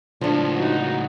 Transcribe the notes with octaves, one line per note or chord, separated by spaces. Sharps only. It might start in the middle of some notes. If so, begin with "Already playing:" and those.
C#2 A2 F3 D4
D#4 F#4